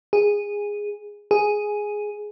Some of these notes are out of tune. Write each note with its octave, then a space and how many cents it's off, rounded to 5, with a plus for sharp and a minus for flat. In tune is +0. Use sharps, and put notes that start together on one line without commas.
G#4 -10
G#4 +5